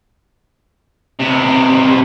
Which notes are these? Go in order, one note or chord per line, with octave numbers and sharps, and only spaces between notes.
C3 B3